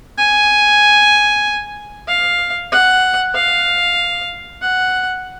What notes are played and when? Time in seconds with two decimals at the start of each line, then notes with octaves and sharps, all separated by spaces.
0.18 G#5
2.08 F5
2.72 F#5
3.35 F5
4.61 F#5